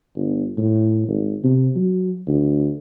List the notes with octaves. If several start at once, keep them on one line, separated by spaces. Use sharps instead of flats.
G1
A2
G#1
C3
F#3
D2